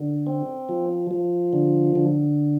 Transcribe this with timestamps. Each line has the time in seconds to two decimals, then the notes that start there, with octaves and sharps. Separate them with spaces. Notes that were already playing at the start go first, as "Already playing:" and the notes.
Already playing: D3
0.27 C4
0.69 F3
1.11 F3
1.53 D3
1.95 D3